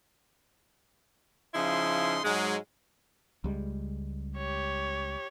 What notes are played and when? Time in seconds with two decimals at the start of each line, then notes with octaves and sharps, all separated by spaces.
1.54 C#3 F3 D#4 E4 C6
2.23 G#2 F#3 G#3
3.44 C#2 G3 G#3
4.38 G4 C#5